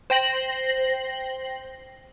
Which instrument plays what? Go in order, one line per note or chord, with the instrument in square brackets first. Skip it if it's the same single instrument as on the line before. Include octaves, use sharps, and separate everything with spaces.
[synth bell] C5 G5 A#6 F#7